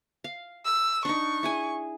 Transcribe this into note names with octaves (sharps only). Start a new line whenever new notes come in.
F5
E6
D4 D#4 C#6
E4 G#4 G#5